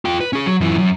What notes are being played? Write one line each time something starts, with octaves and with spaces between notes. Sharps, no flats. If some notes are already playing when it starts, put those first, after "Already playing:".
F4 G5
B4
C#4 G#4
F#3
F#2 E3
F#2